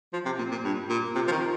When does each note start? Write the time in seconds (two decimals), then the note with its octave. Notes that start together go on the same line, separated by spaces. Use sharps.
0.13 F3
0.25 C3
0.39 A#2
0.51 A#2
0.64 G2
0.89 A#2
1.15 C3 F4
1.27 F3
1.32 D#3